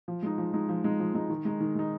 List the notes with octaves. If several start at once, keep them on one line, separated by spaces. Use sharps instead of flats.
F3
G#3 D#4
F3
G#3 D#4
F3
G#3 D#4
F3
G#3 D#4
D#3
G#3 D#4
D#3
G#3 D#4